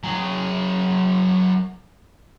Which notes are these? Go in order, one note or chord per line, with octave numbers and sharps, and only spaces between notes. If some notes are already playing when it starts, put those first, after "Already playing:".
F#3 G#4